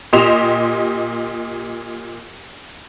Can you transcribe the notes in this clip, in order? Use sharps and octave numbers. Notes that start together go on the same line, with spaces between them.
A#2 G4 D#5 C6 E7 F7